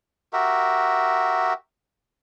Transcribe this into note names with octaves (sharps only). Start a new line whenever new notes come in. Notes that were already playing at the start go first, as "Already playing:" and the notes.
F#4 G4 A#4 E5